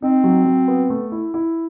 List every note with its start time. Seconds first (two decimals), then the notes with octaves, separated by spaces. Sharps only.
0.02 C4 D#4
0.24 F#3
0.46 F#3
0.68 B3
0.90 A3
1.12 E4
1.34 E4